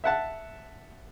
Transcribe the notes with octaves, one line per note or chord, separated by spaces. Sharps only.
E5 F#5 A5